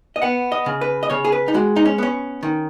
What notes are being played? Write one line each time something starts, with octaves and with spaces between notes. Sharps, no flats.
D#5
B3 F#5
D#5
C#3
B4
D#5
C#3 C#5
G#4
B4
D#4
G#3 F#4
D#4
C#4
B3 C#4
D#3